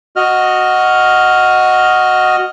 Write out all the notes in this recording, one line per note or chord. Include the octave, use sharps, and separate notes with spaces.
F#4 D#5 F6